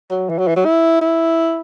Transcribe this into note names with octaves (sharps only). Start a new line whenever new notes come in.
F#3
E3
F#3
E3
F#3
E4
E4